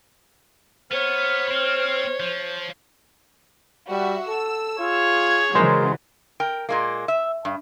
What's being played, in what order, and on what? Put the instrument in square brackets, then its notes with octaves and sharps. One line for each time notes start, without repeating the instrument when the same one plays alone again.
[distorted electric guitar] B3 [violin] C5 C#5 [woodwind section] F6
[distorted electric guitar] C4
F3
[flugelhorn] G3 [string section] F#4 E5
[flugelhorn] A4 [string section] E6
[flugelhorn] F4 [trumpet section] G#4 C#5
[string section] G#6
[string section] C#3 E3 F#3 [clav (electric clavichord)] G#3 C5 [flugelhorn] A#4
[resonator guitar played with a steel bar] A#4 G5
A#2 G#3 A#3
E5
G2